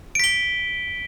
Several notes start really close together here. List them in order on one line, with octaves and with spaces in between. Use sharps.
D7 B6 G7